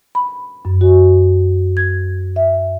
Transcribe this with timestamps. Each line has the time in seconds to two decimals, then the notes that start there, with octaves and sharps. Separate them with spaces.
0.15 B5
0.65 F#2
0.81 F#4
1.77 G#6
2.36 E5